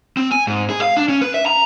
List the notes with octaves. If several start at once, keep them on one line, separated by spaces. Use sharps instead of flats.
C4
G#5
G#2
G#4
F5
D4
C#4
B4
E5
A#5